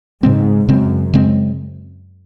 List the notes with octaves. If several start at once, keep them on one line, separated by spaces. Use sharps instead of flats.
G#2 C#3 G#3 C4
F#2 C#3 G#3 C4
C#3 G#3 C4